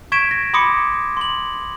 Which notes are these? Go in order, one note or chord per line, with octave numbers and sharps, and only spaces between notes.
C#6 G#6 B6 D7 E7
A#6
B5 C6 D6 D#6 A#6 C#7
C6 F#7